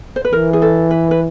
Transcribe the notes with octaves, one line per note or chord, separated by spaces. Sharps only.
C5
B4
E3 A#4
G#4
A4
B4
B4